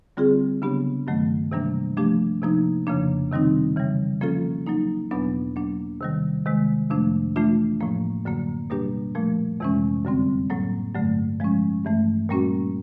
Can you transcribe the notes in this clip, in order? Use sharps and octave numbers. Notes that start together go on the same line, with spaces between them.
D3 G3 C4 F4 G#4
C#3 F#3 B3 D4 G4
G2 D#3 F#3 A3
C3 E3 G3 A#3 D4
F3 A3 D4 G4
C3 F3 A#3 D#4
F2 C#3 F3 A#3 D4
C3 D#3 G3 C4 D#4
C#3 E3 G3
F3 A#3 C#4 F4 A4
F#3 A#3 D#4
E2 B2 F#3 B3 D4
F#3 A#3 D4
C3 D#3 G3
C3 D#3 G#3
F2 C3 F3 A3 D4
E3 A3 D4 F4
A2 F3 A#3
F#2 D3 F#3 A#3
B2 G3 A#3 D4 G4
A#2 F3 A3
F2 C3 E3 G#3 C#4
F#2 D3 G3 C4
A2 F#3 A#3
G2 D3 F#3 A3
F3 G#3 C#4
G2 E3 A3
A#2 G3 A#3 C#4 F#4